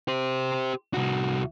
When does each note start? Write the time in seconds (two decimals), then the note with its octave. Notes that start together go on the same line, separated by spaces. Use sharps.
0.08 G4 C5
0.94 C2 F#4